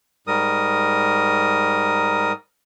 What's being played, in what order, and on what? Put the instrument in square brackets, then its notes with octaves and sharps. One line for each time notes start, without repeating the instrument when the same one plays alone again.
[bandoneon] G#2 G3 A#4 D#6